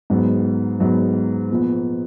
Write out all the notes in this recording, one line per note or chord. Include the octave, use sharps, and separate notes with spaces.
G#2 F#3 B3
G#2 F#3 B3
A#2 F3 B3